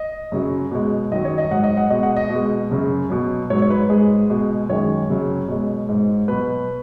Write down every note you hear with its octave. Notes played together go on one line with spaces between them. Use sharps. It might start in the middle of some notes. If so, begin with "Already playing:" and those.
Already playing: D#5
F#2 C#3 F#3
B2 G#3
F#2 D#3 F#3 D#5
C#5
D#5
G#2 F#3 F#5
D#5
F#5
B2 G#3 D#5
F#5
D#5
B2
G#3
F#2 C#3 F#3
B2 F#3
G#2 F#3 C#5
C#5
B4
G#2 G#3 G#4
B2 G#3
F#2 D#3 G#3 C#5
F#2 C#3 F#3
B2 G#3
G#2 G#3
B2 F#3 B4